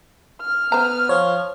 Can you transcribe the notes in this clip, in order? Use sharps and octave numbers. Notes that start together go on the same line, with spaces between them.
F6
B3 C5 A#5
F3 C#5